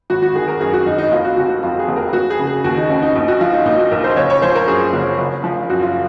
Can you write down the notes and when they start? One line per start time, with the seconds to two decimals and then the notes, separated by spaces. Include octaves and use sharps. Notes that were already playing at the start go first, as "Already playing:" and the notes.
0.10 G#1 F#4
0.22 F#4
0.35 D#3 G#4
0.48 A#4
0.61 F#2 G#4
0.73 F#4
0.86 G#1 D#4
0.98 D#4
1.12 F1 F4
1.24 F#4
1.37 C3 F#4
1.49 F#4
1.63 F2 F4
1.79 G#4
1.88 F1
1.96 A#4
2.13 F1 F#4
2.30 G#4
2.39 C#3
2.47 G#4
2.64 D#2 F#4
2.77 D#4
2.90 F1 C#4
3.02 D#4
3.15 A#1 D#4
3.28 F#4
3.41 F3 F4
3.53 D#4
3.66 A#2 D#4
3.78 F#4
3.91 A#1 A#4
4.04 C5
4.17 F#1 C#5
4.30 C#5
4.42 F3 C5
4.55 A#4
4.68 F#2 G#4
4.93 F#1
5.19 F#1
5.44 F3
5.70 F#2 F#4
5.82 F4